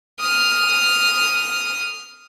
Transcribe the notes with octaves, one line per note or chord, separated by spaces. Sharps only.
D#6 F6